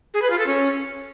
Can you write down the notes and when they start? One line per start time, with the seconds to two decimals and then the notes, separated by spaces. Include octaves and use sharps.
0.14 G#4
0.22 B4
0.30 F4
0.38 A4
0.47 C#4